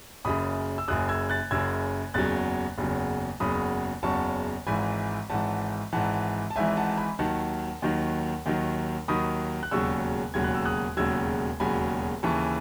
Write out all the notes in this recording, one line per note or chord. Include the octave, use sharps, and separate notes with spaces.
F#1 F#2 C#3 B5 D#6
E6
F#1 F#2 C#3 D#6 F#6
E6 G#6
F#6 A6
F#1 F#2 C#3 E6 G#6
F#1 E2 C#3 F#3 F#6 A6
F#1 E2 C#3 F#3
F#1 E2 C#3 F#3 B5 D#6
F#1 E2 C#3 F#3 A5 C#6
G#1 G#2 E3 G#5 B5
G#1 G#2 E3 F#5 A5
G#1 G#2 E3 F#5 A5
A5
G#1 G#2 E3 E5 G#5
F#5 A5
A5
G#5 B5
D#2 D#3 F#3 F#5 A5
D#2 D#3 F#3
D#2 D#3 F#3
D#2 D#3 F#3 B5 D#6
F#6
E1 D#2 C#3 F#3 C#6 E6
E1 D#2 C#3 F#3 G#6
F#6
E6
D#6 F#6
E1 D#2 C#3 F#3 E6 G#6
E1 D#2 C#3 F#3 G#5 B5
D#2 C#3 E3 A5 C#6